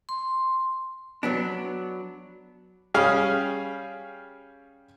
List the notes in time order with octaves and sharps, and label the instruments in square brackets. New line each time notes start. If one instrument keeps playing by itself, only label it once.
[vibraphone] C6
[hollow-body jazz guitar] F#3 B3 D4
[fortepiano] G3 C#4 G#4 F5